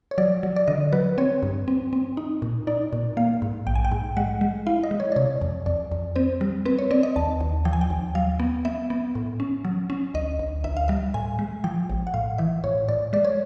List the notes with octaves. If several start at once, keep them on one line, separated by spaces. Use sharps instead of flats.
C#5
F#3 D5
F#3
D5
D3 D#5
F#3 B4
C4 C#5
G2
C4
C4
D#4
A#2
D#4 D5
A#2
A#3 F5
G#2
A#1 G5
G#5
G5
G#2
G#3 F#5
G#3
E4 F5
D#5
G#3
C#5
D5
C3 C#5
F2
F2 D5
F2
C4 C5
G3
C4 B4
C#5
C4 D5
D#5
D#2 A5
D#2
F3 G5
G#5
G5
D#2
F#3 F5
B3
B3 E5
B3
A2
C#4
F#3
C#4
D2 D#5
D2
D2 E5
F5
G3 E5
A2 G#5
G#3
F3 G5
A1
F#5
A2 F5
E3 E5
A2 C#5
A2 D5
G#3 D5
C#5